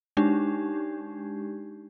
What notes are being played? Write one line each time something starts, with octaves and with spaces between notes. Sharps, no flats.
G#3 D4 D#4 G4